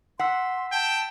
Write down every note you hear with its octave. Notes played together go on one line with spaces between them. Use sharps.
F#5 C6 E6 B6 C7
G5 A5